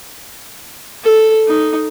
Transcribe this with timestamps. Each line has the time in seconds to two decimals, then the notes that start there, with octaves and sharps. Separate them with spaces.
1.04 A4
1.47 D#4